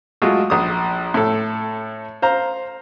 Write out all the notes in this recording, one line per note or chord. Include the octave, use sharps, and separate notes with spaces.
F#3 G#3 A3 F4 F#4
A#1 D#6
A2 A4
C5 F5 A#5